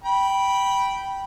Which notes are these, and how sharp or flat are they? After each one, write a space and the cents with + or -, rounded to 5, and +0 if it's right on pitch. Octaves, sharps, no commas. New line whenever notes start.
G5 -10 B5 -15